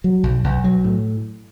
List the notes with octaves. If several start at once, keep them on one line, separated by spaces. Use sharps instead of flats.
F#3
B1
B1
F#3
A2